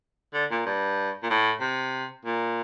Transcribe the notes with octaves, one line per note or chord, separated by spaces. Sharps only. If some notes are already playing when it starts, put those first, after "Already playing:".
D3
A#2
G2
A#2
A2
C3
A#2